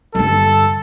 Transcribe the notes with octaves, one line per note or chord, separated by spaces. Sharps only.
G2 D3 A4